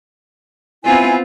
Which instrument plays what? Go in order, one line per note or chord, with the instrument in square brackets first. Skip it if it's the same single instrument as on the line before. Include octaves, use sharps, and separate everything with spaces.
[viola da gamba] B3 C4 F4 [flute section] E4 G#5